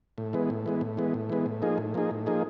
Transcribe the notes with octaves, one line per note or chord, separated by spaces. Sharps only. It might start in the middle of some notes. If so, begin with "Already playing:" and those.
A2
E3 G#3 B3
A2
E3 G#3 B3
A2
E3 G#3 B3
A2
E3 G#3 B3
A2
F3 A#3 D#4 G#4
A2
F3 A#3 D#4 G#4
A2
F3 A#3 D#4 G#4